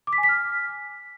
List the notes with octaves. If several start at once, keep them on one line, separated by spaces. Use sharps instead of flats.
D6
B6
G#5
B6
F6